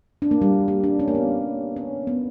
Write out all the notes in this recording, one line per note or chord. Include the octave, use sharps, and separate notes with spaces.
D4
A#3
G3
G3
D4
C#4
A#3
B3
C#4
B3